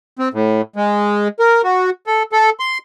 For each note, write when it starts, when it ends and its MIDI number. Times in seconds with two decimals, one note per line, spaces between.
0.19 0.29 60
0.34 0.61 45
0.76 1.28 56
1.40 1.61 70
1.64 1.90 66
2.07 2.23 69
2.32 2.50 69
2.60 2.78 84